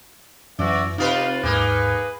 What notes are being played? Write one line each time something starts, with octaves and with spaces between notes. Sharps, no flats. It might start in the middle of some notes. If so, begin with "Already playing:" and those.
F#2 E3 F#4 D5 E5
C3 D#4 F4 G4 B4 D#5 F5
D#2 G#2 A#3 D#4 G#4 B4